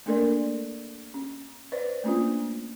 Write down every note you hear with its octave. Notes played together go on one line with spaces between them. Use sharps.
A3 A#3 D4 A4 A#4 D5
C#4
B4 C5 D5
A3 A#3 C#4 D4 F4